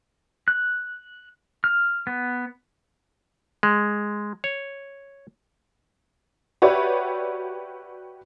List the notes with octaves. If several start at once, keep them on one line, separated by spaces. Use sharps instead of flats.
F#6
F6
B3
G#3
C#5
F#4 G4 B4 C#5 D5 E5